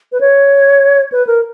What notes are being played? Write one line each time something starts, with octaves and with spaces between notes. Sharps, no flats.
B4
C#5
B4
A#4